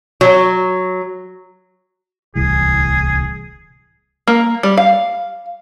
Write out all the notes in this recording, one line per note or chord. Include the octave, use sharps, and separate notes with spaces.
F#3
D1 C2 E3 G#4
A#3
G3
F5